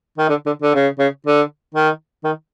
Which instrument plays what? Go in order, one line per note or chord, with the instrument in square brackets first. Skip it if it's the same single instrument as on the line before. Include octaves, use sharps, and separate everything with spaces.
[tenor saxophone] D#3
D3
D3
D3
C#3
C#3
D3
D#3
D#3